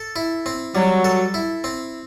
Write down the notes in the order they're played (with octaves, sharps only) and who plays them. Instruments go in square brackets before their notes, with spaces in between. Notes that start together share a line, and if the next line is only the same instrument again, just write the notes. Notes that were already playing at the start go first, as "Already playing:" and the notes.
Already playing: [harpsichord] A4
E4
C4
[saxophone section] F#3 [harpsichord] G3
[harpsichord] A4
E4
C4